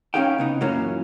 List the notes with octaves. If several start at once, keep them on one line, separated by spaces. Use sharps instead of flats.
C#4 D#4 G4 G#4 F5 G5
C#3 B3 D#4
F#2 A#2 E3 F#3 A#3 C#4